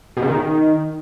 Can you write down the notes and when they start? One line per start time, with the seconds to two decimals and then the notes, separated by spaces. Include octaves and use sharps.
0.17 B2
0.22 C#3
0.28 D#3